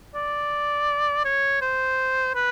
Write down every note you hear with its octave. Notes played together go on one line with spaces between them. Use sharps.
D5
C#5
C5
B4